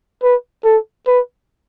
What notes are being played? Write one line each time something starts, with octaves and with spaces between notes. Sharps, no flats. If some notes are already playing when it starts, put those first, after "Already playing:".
B4
A4
B4